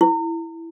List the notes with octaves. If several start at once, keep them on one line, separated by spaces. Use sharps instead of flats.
E4